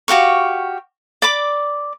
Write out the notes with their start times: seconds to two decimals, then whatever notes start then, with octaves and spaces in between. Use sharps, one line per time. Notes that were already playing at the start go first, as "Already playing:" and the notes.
0.08 F#4 G4 F5 C#6
1.22 D5 B5 D6